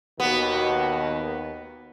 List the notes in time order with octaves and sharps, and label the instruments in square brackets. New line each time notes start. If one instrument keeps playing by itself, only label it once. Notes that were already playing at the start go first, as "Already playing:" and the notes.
[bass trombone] D#2 [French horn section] B2 D#3 F#4 [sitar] B3